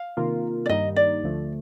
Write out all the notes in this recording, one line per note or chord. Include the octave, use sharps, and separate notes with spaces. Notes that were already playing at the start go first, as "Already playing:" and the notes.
Already playing: F5
C3 D#3 A#3 F4 A#4
D5
G2 D#3 G3 A#3 D#4 D#5
D5
D2 D3 F3 A3